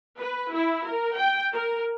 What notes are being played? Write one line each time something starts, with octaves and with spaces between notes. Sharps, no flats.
B4
E4
A#4
G5
A#4